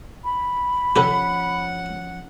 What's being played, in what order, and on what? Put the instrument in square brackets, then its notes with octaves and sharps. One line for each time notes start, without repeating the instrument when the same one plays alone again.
[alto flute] B5
[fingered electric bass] F3 C#4 [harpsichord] G4 A4 B4 [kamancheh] F#5